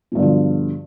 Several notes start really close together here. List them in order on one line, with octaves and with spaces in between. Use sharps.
B2 G2 D3 F3